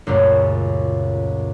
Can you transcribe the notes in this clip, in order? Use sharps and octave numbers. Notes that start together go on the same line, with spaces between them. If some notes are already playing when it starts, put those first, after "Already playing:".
C#2 F#2 A#2 A3